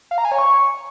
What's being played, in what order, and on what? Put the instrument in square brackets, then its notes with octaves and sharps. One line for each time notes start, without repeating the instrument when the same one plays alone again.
[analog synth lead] F5
A#5
G#5
C#5
C#6